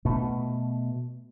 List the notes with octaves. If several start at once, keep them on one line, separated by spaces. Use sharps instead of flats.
B2 A3